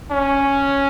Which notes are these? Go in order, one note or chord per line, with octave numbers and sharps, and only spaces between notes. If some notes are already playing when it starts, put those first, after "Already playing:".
C#4